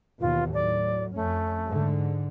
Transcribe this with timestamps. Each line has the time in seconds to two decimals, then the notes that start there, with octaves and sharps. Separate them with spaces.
0.21 D#2 B2 E3 F4
0.54 A2 F#3 D5
1.15 F2 A3 C#4
1.67 G#2 D3